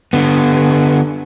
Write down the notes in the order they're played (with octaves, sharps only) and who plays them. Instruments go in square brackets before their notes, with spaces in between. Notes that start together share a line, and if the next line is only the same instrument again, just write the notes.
[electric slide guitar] D3 B3